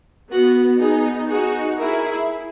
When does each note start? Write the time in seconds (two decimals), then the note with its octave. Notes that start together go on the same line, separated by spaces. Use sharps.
0.31 B3 F#4
0.81 B3 D#4 G#4
1.29 D#4 F#4 G#4
1.79 E4 G#4 A#4